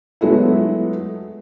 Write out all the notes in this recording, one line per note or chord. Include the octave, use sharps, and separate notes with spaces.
F#3 G#3 A3 B3 E4